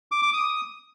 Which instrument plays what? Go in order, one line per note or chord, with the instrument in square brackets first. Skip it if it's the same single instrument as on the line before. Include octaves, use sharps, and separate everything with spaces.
[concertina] D6
D6
D#6